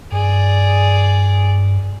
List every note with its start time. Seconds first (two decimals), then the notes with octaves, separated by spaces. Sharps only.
0.12 G2 G#4 D5